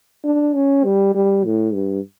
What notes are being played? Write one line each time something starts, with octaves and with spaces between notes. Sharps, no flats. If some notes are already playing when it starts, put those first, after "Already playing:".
D4
C#4
G3
G3
A2
G2